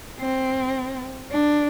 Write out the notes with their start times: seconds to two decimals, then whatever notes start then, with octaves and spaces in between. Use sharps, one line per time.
0.20 C4
1.31 D4